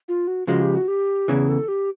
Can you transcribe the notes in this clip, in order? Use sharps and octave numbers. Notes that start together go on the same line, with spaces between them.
F4
F#4
C#3 F3 G#3 F#4
G4
F#4
G4
E2 C#3 E3 G#4
A4
G4